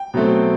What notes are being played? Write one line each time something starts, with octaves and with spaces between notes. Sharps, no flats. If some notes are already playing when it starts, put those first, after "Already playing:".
Already playing: G5
B2 F#3 A3 C4